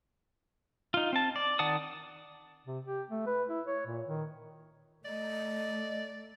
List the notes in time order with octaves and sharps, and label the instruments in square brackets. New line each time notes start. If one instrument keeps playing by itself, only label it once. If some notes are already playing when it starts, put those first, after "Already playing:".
[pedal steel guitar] D#4 F4
C4 A5
D5
D#3 D5 F#5 A5 D#6
[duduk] C3
G4
A3
B4
E4
C#5
A#2
D#3
[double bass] A3 [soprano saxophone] D5 [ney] D#5